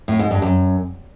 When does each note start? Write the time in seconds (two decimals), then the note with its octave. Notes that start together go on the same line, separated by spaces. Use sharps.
0.08 A2
0.19 G#2
0.31 G2
0.42 F#2